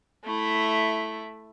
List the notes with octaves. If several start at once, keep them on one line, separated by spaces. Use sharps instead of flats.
A3 E4